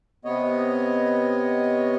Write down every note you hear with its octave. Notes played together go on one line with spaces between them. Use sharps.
C3 B3 C#5 D#5